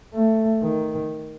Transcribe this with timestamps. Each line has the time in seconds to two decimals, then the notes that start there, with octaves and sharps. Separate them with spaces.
0.14 A3
0.63 D#3